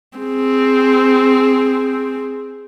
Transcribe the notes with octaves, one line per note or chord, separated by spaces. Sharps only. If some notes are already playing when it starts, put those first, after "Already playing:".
C4 G#4